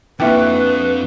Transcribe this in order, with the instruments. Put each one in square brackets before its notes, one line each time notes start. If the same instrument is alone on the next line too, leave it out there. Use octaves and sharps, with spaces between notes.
[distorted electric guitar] F2 [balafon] A#3 E5 G5 [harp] D4 E4 F#4 [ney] B4